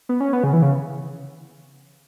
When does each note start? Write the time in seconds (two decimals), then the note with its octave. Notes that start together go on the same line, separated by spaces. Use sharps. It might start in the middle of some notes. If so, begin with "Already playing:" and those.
0.09 B3
0.20 C#4
0.33 B3
0.44 C#3
0.53 E3
0.62 C#3